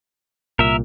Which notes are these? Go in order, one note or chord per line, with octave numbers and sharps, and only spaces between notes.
C2 A#2 A#4 E5